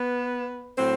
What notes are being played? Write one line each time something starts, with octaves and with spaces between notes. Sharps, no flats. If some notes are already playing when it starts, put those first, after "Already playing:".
Already playing: B3 B4
A2 F#3 C4 C5